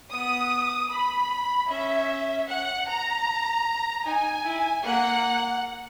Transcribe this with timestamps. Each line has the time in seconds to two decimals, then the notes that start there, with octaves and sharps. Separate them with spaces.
0.11 B3 D#6
0.90 B5
1.68 C#4 E5
2.47 F#5
2.87 A#5
4.05 D#4 G#5
4.45 E4
4.84 A#3 F#5